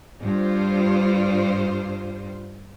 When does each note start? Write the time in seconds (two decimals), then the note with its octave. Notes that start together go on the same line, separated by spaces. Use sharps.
0.23 G2 F4 C5